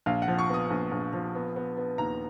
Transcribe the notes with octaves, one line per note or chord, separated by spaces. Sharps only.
A#1 F5
F#5
F3
C#6
B3 D#6
A#1
A#1
F3
B3
B3
B3
D#2 A#5